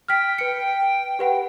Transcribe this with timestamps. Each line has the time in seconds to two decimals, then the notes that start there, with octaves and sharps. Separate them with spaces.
0.08 G5 F6 B6
0.38 B4 C#7
1.19 G4 B4 F#5